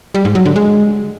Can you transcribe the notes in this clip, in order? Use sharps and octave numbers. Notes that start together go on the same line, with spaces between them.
G3
G#2
F#3
D3
G#3